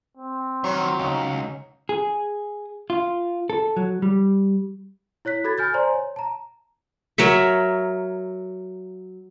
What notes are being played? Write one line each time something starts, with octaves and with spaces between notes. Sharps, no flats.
C4
D#3 F3 F#3 C6
C#2 C#4 D#4
G#4
F4
A4
F#3
G3
E4 C#5 F#6 B6
F#4 A4 B5 G#6 A6
G#5 F6 G6 A6
C5 D5 G#5 A#5 C6
C#5
A5 A#5
F#3 A#4 C#5 E5